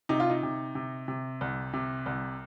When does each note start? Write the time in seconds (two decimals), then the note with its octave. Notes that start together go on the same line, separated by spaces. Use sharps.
0.09 C3 D#4
0.20 F4
0.30 D#4
0.43 C3
0.75 C3
1.08 C3
1.41 C2
1.73 C3
2.06 C2